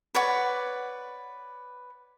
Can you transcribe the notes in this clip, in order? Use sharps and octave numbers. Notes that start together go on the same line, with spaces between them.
B4 C#5 D5 F#5